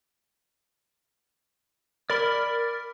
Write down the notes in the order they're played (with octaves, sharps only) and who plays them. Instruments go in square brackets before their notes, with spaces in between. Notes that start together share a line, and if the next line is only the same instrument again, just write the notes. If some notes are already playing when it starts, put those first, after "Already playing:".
[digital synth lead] A#4 [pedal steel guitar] D5 B5